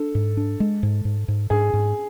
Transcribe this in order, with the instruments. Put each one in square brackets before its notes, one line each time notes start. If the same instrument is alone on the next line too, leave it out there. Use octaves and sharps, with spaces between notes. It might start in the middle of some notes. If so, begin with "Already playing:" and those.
Already playing: [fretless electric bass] D4 [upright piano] A4
[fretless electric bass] G#2
D4
G#3
G#2
G#2
G#2
[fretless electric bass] G#2 [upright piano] G#4
[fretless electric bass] G#2